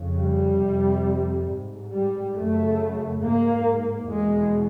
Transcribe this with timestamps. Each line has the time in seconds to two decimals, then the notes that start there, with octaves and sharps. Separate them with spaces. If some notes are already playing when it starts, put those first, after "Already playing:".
Already playing: F2 C#3
0.19 G3
0.62 F2 C3
1.50 G#2
1.93 G3
2.37 F#2 C#3 A3
3.23 G#2 A#3
4.11 E2 B2 G#3